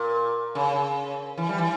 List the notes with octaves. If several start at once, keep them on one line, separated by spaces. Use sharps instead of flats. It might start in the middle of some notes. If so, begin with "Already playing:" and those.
Already playing: A#2
C#3
E3
G3
E3